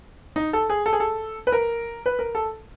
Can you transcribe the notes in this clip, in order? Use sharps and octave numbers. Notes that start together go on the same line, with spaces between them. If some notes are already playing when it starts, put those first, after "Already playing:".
D#4
A4
G#4
A4
G#4
A4
B4
A#4
B4
A#4
A4